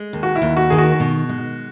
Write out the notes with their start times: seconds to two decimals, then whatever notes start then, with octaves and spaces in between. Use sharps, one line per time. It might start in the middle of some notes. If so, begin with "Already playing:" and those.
Already playing: G#3
0.13 D#2
0.23 F#4
0.36 E4
0.42 D#2
0.57 F#4
0.70 D#3 G#4
0.78 F#4
1.00 B2
1.29 G#3